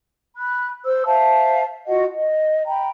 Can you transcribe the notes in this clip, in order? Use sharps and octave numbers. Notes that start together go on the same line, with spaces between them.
B5 F#6
C5 E6
C5 E5 F5 A5
F4 F#4 D#5 F#5
D#5
G5 A#5 B5